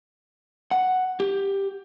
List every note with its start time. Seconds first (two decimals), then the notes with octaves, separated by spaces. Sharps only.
0.71 F#5
1.20 G4